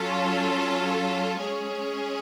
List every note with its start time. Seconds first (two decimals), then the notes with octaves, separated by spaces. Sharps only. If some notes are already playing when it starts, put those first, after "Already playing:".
Already playing: F#3 C#4 F4 A4
1.39 G#3 C#4 G#4 C#5